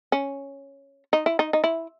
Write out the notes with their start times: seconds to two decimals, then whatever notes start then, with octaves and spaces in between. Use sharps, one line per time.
0.12 C#4
1.13 D#4
1.26 E4
1.39 D#4
1.53 D#4
1.64 E4